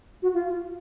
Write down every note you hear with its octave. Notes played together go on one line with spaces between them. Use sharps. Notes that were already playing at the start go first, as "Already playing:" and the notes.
F#4
F4